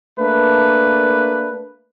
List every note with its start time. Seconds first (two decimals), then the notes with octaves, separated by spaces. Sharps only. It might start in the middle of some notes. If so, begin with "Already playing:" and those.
0.18 A3 A#3 D4 B4